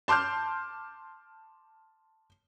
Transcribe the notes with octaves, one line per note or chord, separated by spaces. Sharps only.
A5 C6 D6 F6 G6